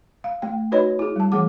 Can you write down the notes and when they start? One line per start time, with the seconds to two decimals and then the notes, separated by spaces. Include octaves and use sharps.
0.24 F5
0.42 A3 G5
0.72 D#4 F#4 B4 C#5 D#5 B5
0.99 E4 G#4
1.16 G3 A5
1.32 E3 A3 G#4 F#5 D6